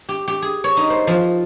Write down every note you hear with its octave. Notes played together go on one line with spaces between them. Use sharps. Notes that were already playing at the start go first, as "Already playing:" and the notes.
G4
G4
G#4
C#5
D#4
C5
F3